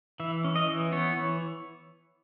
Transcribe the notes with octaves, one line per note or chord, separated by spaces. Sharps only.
E3 E5
C#4
D#5
E3
B3 C#5
E3